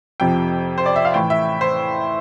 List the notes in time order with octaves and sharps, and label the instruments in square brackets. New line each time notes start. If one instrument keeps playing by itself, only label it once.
[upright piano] F2 C3 F3 G5
C5
D5
E5
F5
A2 E3 G5
E5
C5